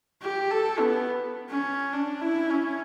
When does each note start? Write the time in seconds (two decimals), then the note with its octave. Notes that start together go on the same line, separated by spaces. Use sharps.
0.22 G4
0.50 A4
0.79 B3
1.50 C#4
1.93 D4
2.21 E4
2.50 C#4